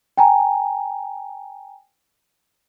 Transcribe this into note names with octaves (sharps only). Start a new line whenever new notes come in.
G5 G#5 A#5